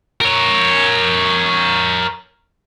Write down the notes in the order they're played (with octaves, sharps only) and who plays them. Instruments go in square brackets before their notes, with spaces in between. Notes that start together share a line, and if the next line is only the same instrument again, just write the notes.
[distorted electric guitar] A#4 C#5